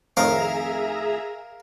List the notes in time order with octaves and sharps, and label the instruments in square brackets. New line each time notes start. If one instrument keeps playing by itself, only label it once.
[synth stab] F2 A2 D#3 [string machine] G#4 E5 A#5 [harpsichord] A#4 F5